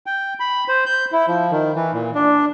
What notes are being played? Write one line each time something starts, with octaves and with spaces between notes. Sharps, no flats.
G5
B5
C5
G6
E4
F3
D#3
E3
A#2
D4